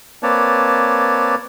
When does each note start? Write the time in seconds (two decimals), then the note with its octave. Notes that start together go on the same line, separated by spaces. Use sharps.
0.23 A#3 C4 B4 C#5 D5 A5